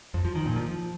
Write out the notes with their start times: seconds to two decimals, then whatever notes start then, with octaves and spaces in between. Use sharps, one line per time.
0.14 F2
0.25 F3
0.35 D#3
0.46 A#2
0.56 F3